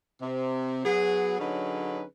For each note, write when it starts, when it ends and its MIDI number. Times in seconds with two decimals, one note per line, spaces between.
0.22 0.84 48
0.84 1.37 54
0.84 1.37 59
0.84 1.37 68
1.38 2.03 50
1.38 2.03 54
1.38 2.03 61
1.38 2.03 63
1.38 2.03 68
1.38 2.03 71